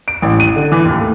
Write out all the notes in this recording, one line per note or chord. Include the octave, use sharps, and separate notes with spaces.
D7
A1
D#7
D3
E3
D#2
A3